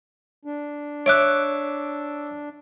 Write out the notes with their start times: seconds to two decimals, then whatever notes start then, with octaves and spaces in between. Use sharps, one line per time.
0.45 D4
1.06 C#5 E5 D6 F#6 D7